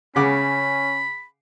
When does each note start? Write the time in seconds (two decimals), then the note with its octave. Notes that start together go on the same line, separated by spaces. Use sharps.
0.16 C#3 C#4 F#5 B5 D6